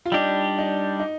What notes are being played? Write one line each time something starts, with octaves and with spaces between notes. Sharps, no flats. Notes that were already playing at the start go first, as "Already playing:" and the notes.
F4
G3 D4 D#4 G4
D#4
D#4